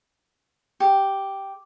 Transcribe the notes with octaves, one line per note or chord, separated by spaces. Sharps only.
G4